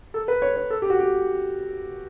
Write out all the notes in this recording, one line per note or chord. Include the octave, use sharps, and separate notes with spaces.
A4
B4
C#5
C#5
A4
G4
F#4
G4